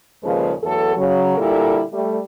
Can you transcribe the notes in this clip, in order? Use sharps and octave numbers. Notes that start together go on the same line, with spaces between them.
D#2 A#2 C#3 F3 G#3 B4
E2 F#3 A3 A4
C#3 F#3
A#2 D3 G3 E4 A4 A#4
G3 A3